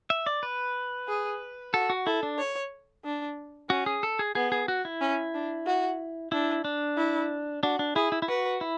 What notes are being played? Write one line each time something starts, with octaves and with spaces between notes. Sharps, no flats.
E5
D5
B4
G#4
F#4 A4
F#4
E4 A4
D4
C#5
D4
C#4 F#4
G#4
A4
G#4
B3 G#4
G#4
F#4
E4
C#4
D4
F#4
D4 E4
D4
E4
D4 F#4
D4
E4 G#4
E4
E4
F#4 B4
E4